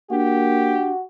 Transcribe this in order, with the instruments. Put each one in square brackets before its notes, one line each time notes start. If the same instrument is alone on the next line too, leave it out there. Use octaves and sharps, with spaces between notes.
[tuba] A#3 [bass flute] D4 [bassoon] F#4 [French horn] G4